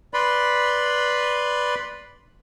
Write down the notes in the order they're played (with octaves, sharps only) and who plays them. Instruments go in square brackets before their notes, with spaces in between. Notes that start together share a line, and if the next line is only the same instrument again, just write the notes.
[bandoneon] B4 D5 B5 C6